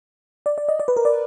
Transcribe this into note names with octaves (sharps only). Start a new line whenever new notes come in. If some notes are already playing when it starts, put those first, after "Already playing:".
D5
D5
D#5
D5
B4
A#4
D5